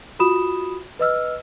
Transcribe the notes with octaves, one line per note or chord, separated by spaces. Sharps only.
F4 F#4 B5 D#6 E7
B4 D#5 E6 F6